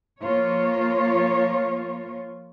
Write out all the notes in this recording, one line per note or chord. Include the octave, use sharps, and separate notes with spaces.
F3 A#3 F4 C#5